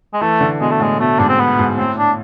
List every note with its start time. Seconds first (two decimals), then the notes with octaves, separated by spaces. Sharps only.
0.13 G#3
0.21 E3 A3
0.41 D3
0.60 B2 G#3
0.71 A3
0.80 A2 G#3
0.99 B2 A3
1.19 G#2 D4
1.29 C4
1.39 B3
1.59 G#2
1.78 A2 C4
1.98 D4